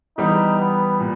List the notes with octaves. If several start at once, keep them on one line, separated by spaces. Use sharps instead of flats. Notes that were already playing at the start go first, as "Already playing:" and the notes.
E3 G3 B3 D#4 G4
B3
A#2